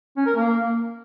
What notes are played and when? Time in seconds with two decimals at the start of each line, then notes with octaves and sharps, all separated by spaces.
0.17 C#4
0.27 A#4
0.36 A#3